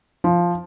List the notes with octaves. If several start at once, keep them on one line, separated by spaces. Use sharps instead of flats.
F3